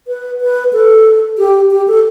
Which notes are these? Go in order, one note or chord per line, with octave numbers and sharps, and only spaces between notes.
B4
B4
A4
G4
G4
A4